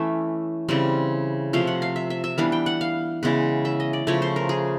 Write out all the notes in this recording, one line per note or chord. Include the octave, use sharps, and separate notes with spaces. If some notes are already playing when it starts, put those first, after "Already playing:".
Already playing: E3 A3 C#4 E5
C#3 E3 G3 C4
C3 F3 A3 F5
F#5
F5
E5
E5
E5
E3 G3 B3 D4 F5
G5
F#5
F5
C#3 E3 G#3 B3
E5
D#5
D5
C#3 F3 A3 C#5
C5
A#4
G#4